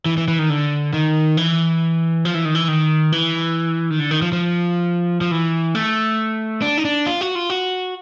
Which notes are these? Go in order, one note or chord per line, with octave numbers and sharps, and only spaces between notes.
E3
E3
E3
D#3
D3
D#3
E3
F3
E3
D#3
E3
D#3
E3
D#3
D3
D#3
F3
F3
F3
E3
A3
D4
D#4
D4
F4
F#4
F4
F#4